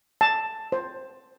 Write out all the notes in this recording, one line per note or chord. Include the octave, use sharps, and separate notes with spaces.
A5
C5